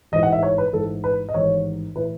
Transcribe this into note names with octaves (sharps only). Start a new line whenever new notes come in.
A1 G#2 E3 D#5
F#5
E5
C#5
B4
A1 G#2 E3 A4
B4
D#5
A1 G#2 D#3 C#5
A2 E3 B4